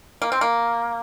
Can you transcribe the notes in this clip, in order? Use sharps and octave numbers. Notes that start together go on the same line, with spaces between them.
A#3
C4
A#3